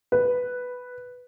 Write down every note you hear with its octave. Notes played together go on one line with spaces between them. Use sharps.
B4